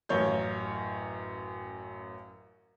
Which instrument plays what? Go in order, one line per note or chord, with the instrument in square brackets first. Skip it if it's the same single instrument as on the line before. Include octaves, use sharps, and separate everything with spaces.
[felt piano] A1 F#2 C#5 F5 G6